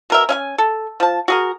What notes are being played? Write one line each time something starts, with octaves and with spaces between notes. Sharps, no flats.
B2 A#4 E5
C#4 E5 G#5
A4
F3 A5
F#4 G#4 A#4